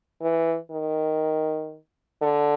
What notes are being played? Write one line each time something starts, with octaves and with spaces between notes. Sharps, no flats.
E3
D#3
D3